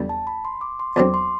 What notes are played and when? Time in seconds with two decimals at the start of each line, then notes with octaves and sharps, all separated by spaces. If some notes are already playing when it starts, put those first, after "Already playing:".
Already playing: E2 D3 G3
0.09 A5
0.27 B5
0.45 C6
0.61 D6
0.80 C6
0.96 E2 D3 F#3 C4 D6
1.14 C6